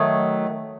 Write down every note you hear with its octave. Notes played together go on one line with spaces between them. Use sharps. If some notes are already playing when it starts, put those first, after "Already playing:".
Already playing: D#3 F#3 A3 D#5